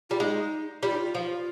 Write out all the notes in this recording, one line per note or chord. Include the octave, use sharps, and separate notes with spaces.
G3 F4
G#3 D#4
G3 F4
D#4
F4
F3